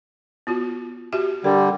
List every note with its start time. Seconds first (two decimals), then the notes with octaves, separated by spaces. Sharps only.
0.47 B3 F4 F#4
1.13 F#4 G4 E5
1.44 D3 G3 A#4